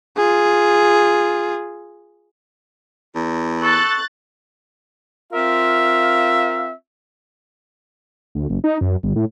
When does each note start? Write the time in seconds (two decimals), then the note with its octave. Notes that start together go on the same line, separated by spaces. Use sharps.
0.17 F4 G#4
3.15 E2
3.62 A4 C#6 F#6 A6
5.33 C4 F4 A#4 E5 F5
8.35 D2
8.50 F#1
8.64 D#4
8.81 F#2
9.03 G1
9.16 A2